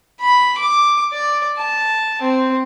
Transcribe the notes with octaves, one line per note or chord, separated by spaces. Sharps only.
B5
D6
D5
A5
C4